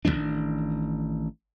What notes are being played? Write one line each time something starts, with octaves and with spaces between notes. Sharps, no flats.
A1 C3 D#3 D4